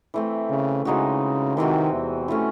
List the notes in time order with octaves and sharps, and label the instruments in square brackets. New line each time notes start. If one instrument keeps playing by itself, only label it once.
[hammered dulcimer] E3 A3 C4
[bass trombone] C#3
[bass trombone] C#3 [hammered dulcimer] E3 G#3 D#4 F#4
[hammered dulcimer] C3 E3 C4 F#4 [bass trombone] D#3
[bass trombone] E2
[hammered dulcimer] E3 A3 C#4